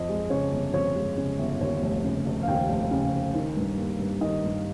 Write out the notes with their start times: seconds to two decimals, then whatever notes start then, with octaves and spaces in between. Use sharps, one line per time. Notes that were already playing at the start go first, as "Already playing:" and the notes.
Already playing: F2 D#5
0.09 G#3
0.30 C#3 C#5
0.52 G1
0.74 F2 C#5
0.96 G#3
1.18 C#3
1.39 G1
1.61 D#2 C#5
1.83 F1
2.04 C#3
2.26 F1
2.43 F5
2.48 D#2 G5
2.70 F1
2.91 C#3 F5
3.13 F1
3.35 D#3
3.57 G2
3.78 A#3
4.00 G2
4.21 D#3 D#5
4.44 G2